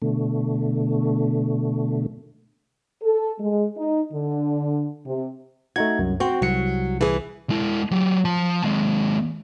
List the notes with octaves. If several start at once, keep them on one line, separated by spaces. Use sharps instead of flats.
B2 D3 A3
A4
G#3
D#4
D3
C3
A3 D#4 F#4 G#6
C2 F#2
C4 F#4
C2 F#3 C#7
E3 G#4
G#3 E4
F#3 G4
F3 A5
D#2 G#3